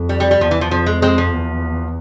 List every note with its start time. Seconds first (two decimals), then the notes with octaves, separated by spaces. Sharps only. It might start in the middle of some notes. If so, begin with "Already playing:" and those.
Already playing: F2
0.09 G3
0.20 G3
0.31 G3
0.41 E2 F3
0.51 E3
0.61 F3
0.71 F2 F3
0.86 G#3
1.02 G#3 C4
1.18 F3
1.33 E2